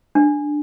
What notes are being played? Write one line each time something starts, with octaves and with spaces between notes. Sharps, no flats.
D4